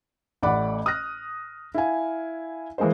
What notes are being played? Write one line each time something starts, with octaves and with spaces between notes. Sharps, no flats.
A1 A2 D5 F#5 B5 D6
D#6 F6 F#6 A#6
E4 F5 G#5
E3 G#3 A#3 C5